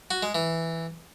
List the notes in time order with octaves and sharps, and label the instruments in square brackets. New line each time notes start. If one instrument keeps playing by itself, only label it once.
[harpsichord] F#4
G#3
E3